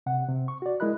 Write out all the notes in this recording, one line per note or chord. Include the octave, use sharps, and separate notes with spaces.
C3 F#5
C3
C#6
F#4 D5
G#3 E4 A#4 D#5 B5 F#6